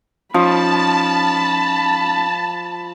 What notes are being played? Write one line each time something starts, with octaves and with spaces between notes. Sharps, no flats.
F3 C#4 D#4 A5 B5